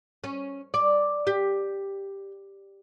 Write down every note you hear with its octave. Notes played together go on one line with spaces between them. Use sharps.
C#4
D5
G4